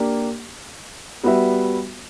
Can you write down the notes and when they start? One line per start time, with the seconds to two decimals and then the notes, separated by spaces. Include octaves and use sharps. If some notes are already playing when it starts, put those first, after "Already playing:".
Already playing: A#3 D4 G4 A#4
1.23 G3 B3 F#4 B4 E5